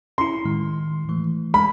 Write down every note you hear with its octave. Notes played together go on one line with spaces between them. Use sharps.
C#4 E4 C6
A2 D#3 G#3
E3 A3
G#3 B5